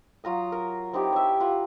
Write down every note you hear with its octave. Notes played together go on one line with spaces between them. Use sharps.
F#3 F4 A#5 D#6
A#4
C4 D#4 E4 G4
C#5 E5
F4 F#5